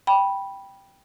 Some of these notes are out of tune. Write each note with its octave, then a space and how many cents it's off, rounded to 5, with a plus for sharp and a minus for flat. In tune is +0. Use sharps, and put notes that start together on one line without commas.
G5 +0 B5 -10